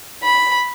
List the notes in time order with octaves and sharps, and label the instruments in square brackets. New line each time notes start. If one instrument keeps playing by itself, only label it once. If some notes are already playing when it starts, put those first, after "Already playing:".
[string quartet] B5